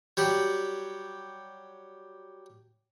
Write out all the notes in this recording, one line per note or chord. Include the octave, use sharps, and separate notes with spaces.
F#3 G3 G4